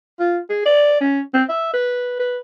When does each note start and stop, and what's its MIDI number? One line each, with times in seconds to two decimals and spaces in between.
0.20 0.39 65
0.50 0.62 68
0.66 1.00 74
1.01 1.21 61
1.34 1.44 60
1.49 1.70 76
1.74 2.15 71
2.20 2.38 71